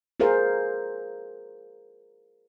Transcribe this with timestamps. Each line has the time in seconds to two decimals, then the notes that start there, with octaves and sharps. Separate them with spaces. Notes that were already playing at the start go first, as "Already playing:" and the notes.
0.20 F4 G#4 A#4 C5 F5